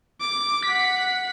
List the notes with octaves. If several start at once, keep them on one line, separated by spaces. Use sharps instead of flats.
D6
F#5 B6